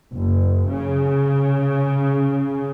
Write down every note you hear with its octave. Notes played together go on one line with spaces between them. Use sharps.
F#1
C#3